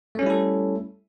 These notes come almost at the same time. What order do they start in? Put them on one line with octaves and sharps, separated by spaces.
A3 C#4 G3 E4 A4